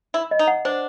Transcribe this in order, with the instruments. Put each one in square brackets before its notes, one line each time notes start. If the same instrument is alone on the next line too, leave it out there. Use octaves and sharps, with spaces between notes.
[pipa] E4 [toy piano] B5
[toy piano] D#5
[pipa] D#4
[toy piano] F#5
[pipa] D4 [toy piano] C5